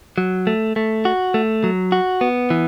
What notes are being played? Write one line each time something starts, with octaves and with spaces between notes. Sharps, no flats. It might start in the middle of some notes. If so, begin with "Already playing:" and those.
F#3
A3
A3
F#4
A3
F#3
F#4
B3
E3